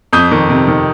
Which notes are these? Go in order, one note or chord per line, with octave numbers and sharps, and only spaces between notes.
F2 D#6 G6
D#3
C3
D#3